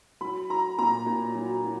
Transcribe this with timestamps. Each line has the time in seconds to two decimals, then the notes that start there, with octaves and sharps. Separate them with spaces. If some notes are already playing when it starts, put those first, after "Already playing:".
0.21 F#3 B5
0.50 F#3 A#5
0.78 A#2 A#5
1.06 A#2
1.35 F#3
1.64 F#3